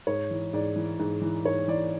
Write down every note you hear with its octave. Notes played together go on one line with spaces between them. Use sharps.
G#2 C#5
E3
G#2 D5
E3
G#2
E3
G#2 C#5
E3 D5